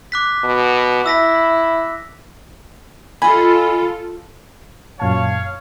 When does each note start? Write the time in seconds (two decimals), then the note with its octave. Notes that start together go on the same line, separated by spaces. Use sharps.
0.12 D6 F#6 B6
0.44 B2
1.06 E4 E6 A#6 B6
3.22 F4 A4 D#5 G#5 B5
5.00 F#2 A#2 C#5 F5 A5